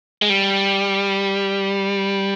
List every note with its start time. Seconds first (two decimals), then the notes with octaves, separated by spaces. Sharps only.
0.22 G#3
0.30 G3